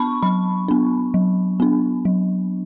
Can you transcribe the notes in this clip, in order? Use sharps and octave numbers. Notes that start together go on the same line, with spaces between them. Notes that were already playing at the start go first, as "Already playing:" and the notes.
Already playing: B3 D4 A5 B5 C#6
F#3 B5
B3 D4
F#3
B3 D4
F#3